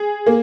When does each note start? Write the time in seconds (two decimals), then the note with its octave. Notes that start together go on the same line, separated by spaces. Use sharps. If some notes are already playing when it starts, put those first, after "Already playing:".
Already playing: G#4
0.26 A#3